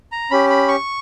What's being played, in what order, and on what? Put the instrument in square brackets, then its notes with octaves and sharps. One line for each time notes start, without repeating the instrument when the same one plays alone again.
[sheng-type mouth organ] A#5
C#4 G4 B5
B5
C#6